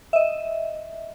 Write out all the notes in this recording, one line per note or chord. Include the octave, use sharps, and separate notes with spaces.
D#5 E5